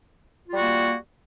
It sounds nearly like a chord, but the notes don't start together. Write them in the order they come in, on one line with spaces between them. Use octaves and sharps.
F4 G3 F#4 A#3